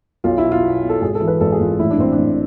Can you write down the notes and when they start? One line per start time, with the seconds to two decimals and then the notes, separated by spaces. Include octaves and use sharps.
0.24 B1 F4
0.38 E4
0.44 B2
0.52 F4
0.63 B2
0.82 B2
0.89 A4
1.01 G#1 G#4
1.15 A4
1.20 E3
1.27 B4
1.40 G#1 A4
1.52 G#4
1.60 G#1 F4
1.79 A1 E4
1.90 D4
1.98 A1 C4
2.12 D4
2.18 A1